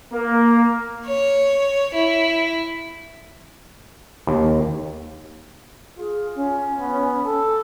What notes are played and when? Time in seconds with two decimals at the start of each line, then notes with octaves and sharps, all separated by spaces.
0.13 A#3
1.06 C#5
1.94 E4
4.27 D#2
5.98 F4 G#4
6.35 C#4
6.79 B3
7.26 A4